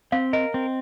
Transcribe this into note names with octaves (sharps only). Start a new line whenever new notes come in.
C4 F5
A#4 D#5
C4